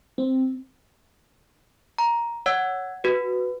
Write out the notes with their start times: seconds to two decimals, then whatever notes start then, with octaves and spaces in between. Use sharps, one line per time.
0.18 C4
1.98 A#5
2.46 C#5 F#5 E6 G#6
3.04 F#4 B4